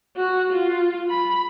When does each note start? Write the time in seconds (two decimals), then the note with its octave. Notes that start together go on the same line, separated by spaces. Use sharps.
0.16 F#4
0.53 F4
1.10 B5